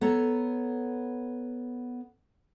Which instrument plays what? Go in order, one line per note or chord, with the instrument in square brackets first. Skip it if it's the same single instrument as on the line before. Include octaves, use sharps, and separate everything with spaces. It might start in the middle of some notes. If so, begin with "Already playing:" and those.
[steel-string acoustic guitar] B3 A4 C#5 A#5